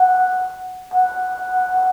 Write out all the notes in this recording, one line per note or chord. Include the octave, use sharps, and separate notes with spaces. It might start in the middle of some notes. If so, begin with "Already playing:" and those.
Already playing: F#5
F#5